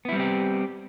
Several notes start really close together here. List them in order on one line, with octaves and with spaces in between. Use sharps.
B3 E4 G3 C4 G4